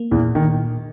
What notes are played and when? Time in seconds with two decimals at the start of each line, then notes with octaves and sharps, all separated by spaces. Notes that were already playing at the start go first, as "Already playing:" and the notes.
Already playing: A#3
0.11 E2 A#2 E3
0.35 A#2 D#3